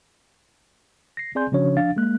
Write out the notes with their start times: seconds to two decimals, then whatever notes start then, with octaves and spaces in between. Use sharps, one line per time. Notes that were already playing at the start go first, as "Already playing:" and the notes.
1.17 A#6 C7
1.35 C4 G#4 D5 G#5 C6 G6
1.52 C#3 F3 C#4 D4 F#4 C#5
1.77 F3 D4 F5 A6
1.96 G#3 A#3 F#6